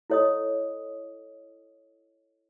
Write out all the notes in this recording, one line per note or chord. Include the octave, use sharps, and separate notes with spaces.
E4 A4 C#5 D#5 D#6